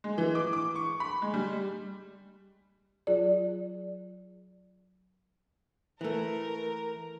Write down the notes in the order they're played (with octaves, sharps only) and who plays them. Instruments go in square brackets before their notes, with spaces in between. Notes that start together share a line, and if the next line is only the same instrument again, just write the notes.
[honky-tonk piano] G#3
E3
D6
D6
C#6
B5
G#3
G3
[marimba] F#3 F4 G#4 D5
[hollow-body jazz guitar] E3 A3 [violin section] A#4